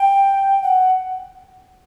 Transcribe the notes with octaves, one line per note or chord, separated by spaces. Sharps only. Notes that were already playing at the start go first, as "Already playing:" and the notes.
Already playing: G5
F#5